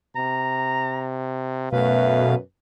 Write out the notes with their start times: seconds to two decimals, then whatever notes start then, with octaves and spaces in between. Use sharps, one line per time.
0.16 C3 A#5
1.72 F#2 B2 A3 B4 F5